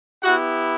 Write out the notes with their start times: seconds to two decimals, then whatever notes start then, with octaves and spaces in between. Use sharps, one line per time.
0.23 B3 E4 F#4 G4 F#5